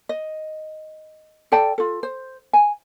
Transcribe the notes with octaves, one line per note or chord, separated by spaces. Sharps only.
D#5
A4 D5 G5 A5
F4 A4
C5
G#5